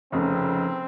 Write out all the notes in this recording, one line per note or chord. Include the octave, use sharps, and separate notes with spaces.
F1 F2 C#3 C4